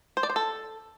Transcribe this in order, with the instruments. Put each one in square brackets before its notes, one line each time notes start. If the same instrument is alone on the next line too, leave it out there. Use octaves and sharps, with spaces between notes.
[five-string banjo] C5
D5
C5
A4